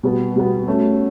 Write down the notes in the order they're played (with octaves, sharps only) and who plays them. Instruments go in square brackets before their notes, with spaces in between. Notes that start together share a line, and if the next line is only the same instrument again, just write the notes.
[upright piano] B2 G3 B3
B2 G3 B3
A3 C#4 F#4